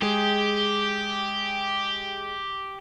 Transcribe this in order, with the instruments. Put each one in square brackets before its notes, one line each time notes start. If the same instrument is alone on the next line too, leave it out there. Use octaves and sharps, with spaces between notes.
[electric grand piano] G#3 G#4 [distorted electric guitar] G4